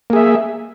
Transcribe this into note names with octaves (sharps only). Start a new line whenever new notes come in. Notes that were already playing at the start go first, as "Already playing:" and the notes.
A#3 G#4 E5